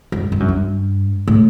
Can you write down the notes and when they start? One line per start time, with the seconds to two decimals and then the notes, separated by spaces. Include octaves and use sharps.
0.12 F#2
0.32 G2
0.40 F#2
0.49 G2
1.27 A2